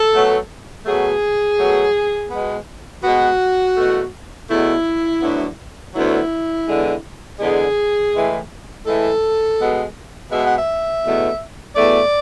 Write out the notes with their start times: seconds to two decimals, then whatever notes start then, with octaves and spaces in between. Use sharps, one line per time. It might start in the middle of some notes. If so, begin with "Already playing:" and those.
Already playing: A4
0.13 B2 F#3 A3
0.86 B2 F#3 A3 G#4
1.59 B2 F#3 A3
2.31 B2 G#3 B3
3.03 B2 G#3 B3 F#4
3.77 E2 B2 A3
4.49 E2 B2 A3 E4
5.21 D2 D3 F#3 B3
5.94 D2 D3 F#3 B3 E4
6.67 E2 D3 G#3
7.39 E2 D3 G#3 G#4
8.12 A2 E3 G#3
8.85 A2 E3 G#3 A4
9.58 B2 G#3 B3
10.30 B2 G#3 B3 E5
10.44 F#5
10.58 E5
11.03 E2 B2 A3
11.75 E2 B2 A3 D5